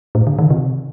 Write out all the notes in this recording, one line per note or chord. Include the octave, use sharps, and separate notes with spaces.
A2
D3
D#3
C3